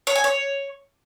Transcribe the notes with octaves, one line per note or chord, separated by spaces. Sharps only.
C#5
G#5
C#5